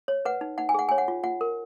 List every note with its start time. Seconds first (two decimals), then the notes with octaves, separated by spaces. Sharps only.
0.08 C#5
0.25 B4 F#5
0.41 D#4
0.58 D#4 F#5
0.69 G#5
0.74 G#4 F#5
0.89 C#5 G#5
0.98 F#5
1.08 F4
1.24 F4 F#5
1.41 A#4